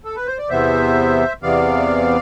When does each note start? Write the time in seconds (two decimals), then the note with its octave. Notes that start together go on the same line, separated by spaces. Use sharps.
0.05 A4
0.16 B4
0.27 C5
0.38 D5
0.50 E2 C3 E3 B3 C5 E5
1.42 E2 C3 E3 B3 D5 F5